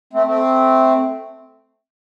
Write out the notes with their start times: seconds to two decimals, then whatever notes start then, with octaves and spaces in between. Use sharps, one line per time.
0.13 A3 C4
0.26 A3 C4